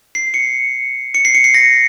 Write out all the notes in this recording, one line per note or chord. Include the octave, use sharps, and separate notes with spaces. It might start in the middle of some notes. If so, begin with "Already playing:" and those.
C7
C#7
C#7
C7
C#7
C7
A#6